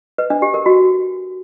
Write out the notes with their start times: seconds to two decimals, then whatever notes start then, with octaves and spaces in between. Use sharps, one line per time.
0.18 B4
0.30 D4
0.42 G4
0.54 A#4
0.66 F#4